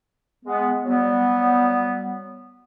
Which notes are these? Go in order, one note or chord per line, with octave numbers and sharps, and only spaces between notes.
G#3 B3
F#3 G3 B3